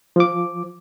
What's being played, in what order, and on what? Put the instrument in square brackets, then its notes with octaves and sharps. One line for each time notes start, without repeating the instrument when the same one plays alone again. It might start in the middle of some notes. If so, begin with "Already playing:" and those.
[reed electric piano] F3 D6